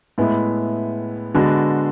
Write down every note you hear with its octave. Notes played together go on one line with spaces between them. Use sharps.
A2 G#3 B3 E4
D3 G#3 B3 D4 F#4